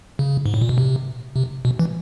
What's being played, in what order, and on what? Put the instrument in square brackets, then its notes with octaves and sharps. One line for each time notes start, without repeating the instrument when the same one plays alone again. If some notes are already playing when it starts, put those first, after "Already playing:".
[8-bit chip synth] C#3
G#2
A2
A#2
B2
C3
C3
B2
E3